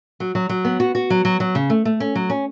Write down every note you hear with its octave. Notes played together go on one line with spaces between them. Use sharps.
F#3
F#3
F#3
B3
F#4
F#4
F#3
F#3
F#3
C#3
A3
A3
C#4
F#3
C#4